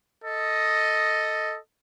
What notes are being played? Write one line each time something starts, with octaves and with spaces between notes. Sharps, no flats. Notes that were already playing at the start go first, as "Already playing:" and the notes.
A4 D#5